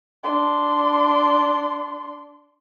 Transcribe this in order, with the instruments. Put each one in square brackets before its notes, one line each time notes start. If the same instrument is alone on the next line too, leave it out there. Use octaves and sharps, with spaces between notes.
[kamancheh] D4 C6